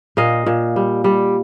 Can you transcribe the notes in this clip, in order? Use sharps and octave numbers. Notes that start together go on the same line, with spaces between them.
A#2 D#5 F5
A#2
G3
G3